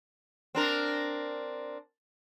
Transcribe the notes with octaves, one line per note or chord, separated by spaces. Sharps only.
C4 D4 A#4